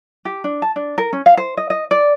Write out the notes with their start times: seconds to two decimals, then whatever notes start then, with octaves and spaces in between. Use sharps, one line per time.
0.25 G4
0.44 D4
0.62 A5
0.76 D4
0.98 A#4
1.13 C#4
1.26 F5
1.37 C5
1.57 D#5
1.70 D#5
1.91 D5